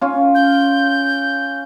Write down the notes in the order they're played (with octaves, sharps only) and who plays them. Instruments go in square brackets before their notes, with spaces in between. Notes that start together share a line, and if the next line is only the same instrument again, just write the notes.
[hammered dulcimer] C#4 F4
[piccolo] G6